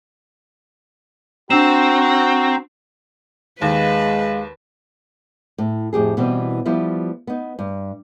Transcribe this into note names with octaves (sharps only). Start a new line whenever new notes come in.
C4 D4 F#4 G5 A#5 E6 E7
D#2 G#3 B4 F5
A2
F2 A2 G4 G#4
B2 E3 G3 C4
F3 G3 B3 E4 F4
B3 D#4
G2